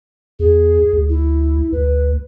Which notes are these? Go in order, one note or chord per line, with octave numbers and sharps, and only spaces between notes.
E2 G#4
D2
E4
D2 B4